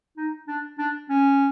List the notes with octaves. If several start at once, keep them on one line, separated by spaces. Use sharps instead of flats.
D#4
D4
D4
C#4